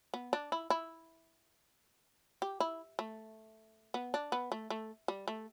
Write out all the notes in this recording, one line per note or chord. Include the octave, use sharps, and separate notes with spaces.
B3
D4
E4
E4
G4
E4
A3
B3
D4
B3
A3
A3
G3
A3